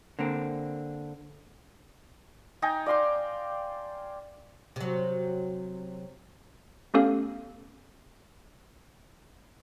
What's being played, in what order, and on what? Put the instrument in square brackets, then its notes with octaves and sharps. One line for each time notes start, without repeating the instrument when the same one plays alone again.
[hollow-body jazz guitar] D3 A#3 C4
[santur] D#4 G5 G#5 A#5
D5 F5 C6 D6
[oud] C3 F#3
[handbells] A3 B3 C#4 G4 A4 F5